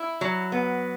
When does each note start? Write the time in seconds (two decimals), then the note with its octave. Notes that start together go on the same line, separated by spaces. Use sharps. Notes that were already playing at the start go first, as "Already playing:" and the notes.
Already playing: E4
0.21 F#3
0.52 B3